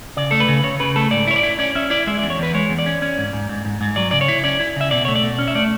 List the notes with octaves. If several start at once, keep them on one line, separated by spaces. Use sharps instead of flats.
C#3 D5
A3 A4
B4
C#3
C#3 C#5
C#3 B4
A3 A4
G#2 D5
E4 C#5
D5
E4
C#4 D5
C#4 E5
E4 D5
G#3 E5
D5
E2
C#5
E2 B4
G#3 C#5
E2
D5
C#4
C#4
G#2
G#2
G#2
G#2
G#2
F#3 D5
C#3 D5
C#5
E4
C#4 D5
E4
C#3 E5
B2 D5
A3 C#5
D5
B2
C#4
E5
A3 D5